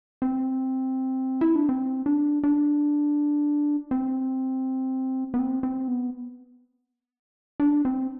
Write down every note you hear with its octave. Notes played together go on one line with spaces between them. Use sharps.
C4
E4
D4
C4
D4
D4
C4
B3
C4
C4
B3
D4
C4